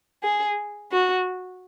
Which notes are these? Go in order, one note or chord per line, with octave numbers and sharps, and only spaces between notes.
G#4
F#4